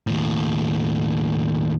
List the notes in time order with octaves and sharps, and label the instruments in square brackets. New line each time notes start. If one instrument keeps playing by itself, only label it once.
[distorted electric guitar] D#2 A2